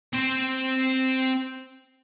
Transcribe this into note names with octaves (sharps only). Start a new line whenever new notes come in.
C4 C5